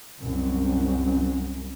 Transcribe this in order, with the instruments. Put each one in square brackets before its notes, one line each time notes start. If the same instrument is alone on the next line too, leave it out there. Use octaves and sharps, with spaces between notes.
[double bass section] C2 F#2